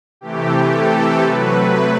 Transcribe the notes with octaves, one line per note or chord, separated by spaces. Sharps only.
C3 E3 A3 G4
A4
C3 F#3 A3 B4